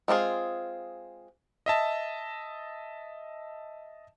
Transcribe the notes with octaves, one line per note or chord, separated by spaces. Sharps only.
G#3 C4 F4 G#4
D#5 E5 A5